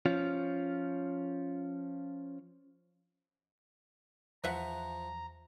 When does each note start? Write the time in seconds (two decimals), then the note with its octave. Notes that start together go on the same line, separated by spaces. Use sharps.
0.06 F3 C#4 F4
4.44 E2 F3 B4 E5 F#5 A#5